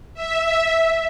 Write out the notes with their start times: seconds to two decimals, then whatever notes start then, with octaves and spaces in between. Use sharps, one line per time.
0.14 E5